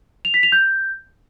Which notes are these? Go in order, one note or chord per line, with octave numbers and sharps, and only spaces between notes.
F7
B6
F7
G6